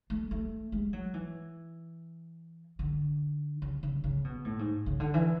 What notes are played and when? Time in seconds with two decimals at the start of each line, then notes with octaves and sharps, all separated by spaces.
0.10 A3
0.31 A3
0.72 G#3
0.93 F#3
1.14 E3
2.79 D3
3.62 C#3
3.83 C#3
4.04 C#3
4.24 B2
4.45 A2
4.59 G#2
4.86 C#3
5.00 D3
5.14 E3